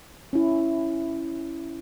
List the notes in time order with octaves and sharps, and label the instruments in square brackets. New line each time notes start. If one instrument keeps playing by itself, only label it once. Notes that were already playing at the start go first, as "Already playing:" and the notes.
[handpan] C#4 E4